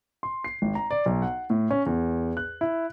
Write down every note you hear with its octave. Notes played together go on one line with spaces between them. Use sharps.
C6
C7
G#1
A#5
D5
B1
F#5
A2
C#4
E2
F#6
E4